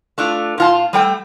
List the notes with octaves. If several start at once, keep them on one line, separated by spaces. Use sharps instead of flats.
A3 D4 F4
A#2 F4 A5
G3 A3 G5